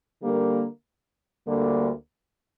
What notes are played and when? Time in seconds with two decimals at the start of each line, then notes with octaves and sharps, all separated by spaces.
0.21 D3 G3 A#3
1.46 D2 D3 G3 A#3